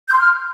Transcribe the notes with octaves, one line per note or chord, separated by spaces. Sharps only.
G6
C6
F6